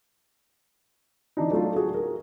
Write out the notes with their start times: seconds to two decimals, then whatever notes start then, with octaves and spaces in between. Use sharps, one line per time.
1.37 E3 D4 D#4
1.50 F#3 A3 D4 F4
1.76 F#4 G#4
1.92 G#4 A#4